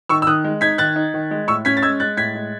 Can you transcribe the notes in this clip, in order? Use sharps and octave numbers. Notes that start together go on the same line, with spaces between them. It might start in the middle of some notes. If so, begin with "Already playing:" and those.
D#3 C#6 E6
E6
D#3 D#6 F#6
G#3
D#4 G#6 B6
D#3 F#6 A6
D#4
D#3
G#3
A2 C#6 E6
C#4 G#6 B6
A6
G#3 E6 G#6
G#3 F#6 A6
A2 G#6 B6
G#3